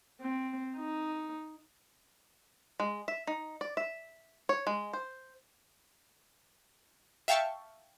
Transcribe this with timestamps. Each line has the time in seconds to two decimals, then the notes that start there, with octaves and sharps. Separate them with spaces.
0.21 C4
0.77 D#4
2.80 G#3
3.08 E5
3.27 D#4
3.61 D5
3.77 E5
4.49 C#5
4.67 G#3
4.93 C5
7.28 E5 F5 G5 A5 C#6